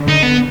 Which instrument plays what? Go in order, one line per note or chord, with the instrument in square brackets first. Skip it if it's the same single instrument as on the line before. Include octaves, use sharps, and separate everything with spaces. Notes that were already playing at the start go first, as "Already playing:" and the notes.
Already playing: [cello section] D3
[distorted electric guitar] D#4
B3